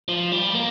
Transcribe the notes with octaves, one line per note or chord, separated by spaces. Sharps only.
F3
G3
A#3